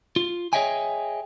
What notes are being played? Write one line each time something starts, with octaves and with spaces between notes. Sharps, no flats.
F4
G#4 C#5 D#5 E5 G5 G#5